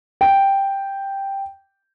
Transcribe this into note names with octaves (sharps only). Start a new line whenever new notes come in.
G5